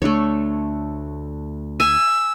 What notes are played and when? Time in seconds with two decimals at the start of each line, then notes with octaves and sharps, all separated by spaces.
0.02 D2 A3 D4 C#5
1.80 G#5 E6